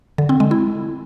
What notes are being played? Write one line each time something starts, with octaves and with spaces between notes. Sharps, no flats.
D3
C4
G#3
E4